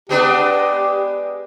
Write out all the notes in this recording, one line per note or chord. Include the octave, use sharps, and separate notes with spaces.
G#3 B3 D4 G4